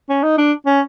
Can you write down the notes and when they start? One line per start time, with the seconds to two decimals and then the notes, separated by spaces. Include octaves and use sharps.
0.09 C#4
0.23 D#4
0.38 D4
0.66 C#4